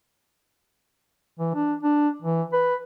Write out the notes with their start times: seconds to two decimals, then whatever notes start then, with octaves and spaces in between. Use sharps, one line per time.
1.39 E3
1.55 D4
1.83 D4
2.22 E3
2.53 B4